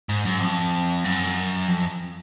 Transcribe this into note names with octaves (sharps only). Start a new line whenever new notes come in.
G#2
F#2
F2
F#2
F2